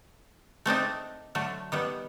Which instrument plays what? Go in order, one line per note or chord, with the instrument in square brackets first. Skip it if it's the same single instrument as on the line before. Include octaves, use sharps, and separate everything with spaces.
[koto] A3 C4 D4 D#4
D3 F#3 A3
D#3 G3 B3